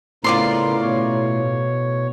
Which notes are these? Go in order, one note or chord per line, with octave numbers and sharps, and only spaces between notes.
A2 C#3 B3 F4 A#4 D5 C6
B2 C#5